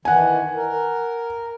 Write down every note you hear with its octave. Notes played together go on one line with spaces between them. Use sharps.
D#3 E3 F#5 G#5
A#4